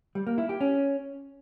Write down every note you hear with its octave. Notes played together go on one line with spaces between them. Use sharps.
G3
A#3
E4
G4
C#4